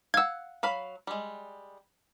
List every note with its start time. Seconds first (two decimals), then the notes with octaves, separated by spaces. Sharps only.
0.14 F5 F#5 E6 G#6
0.63 F#3 F5 B5
1.07 G3 G#3